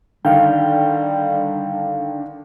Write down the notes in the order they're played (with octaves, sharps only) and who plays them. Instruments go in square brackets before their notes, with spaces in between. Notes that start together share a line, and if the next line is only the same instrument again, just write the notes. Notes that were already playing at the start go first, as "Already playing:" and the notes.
[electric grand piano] D3 D#3 [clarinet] G3 [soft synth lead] D4 [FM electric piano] F5 G5